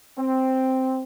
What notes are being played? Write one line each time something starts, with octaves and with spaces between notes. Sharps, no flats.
C4